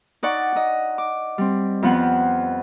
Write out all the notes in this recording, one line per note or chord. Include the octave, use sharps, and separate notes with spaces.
D#4 D5 F#5 C#6
D#4 D#5
D6
G3 C4
F2 F3 B3 F#5